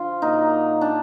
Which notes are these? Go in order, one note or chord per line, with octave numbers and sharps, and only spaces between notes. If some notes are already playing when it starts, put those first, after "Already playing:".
Already playing: D3 F3 F4
A#2 F#3 A#3 D#4
D4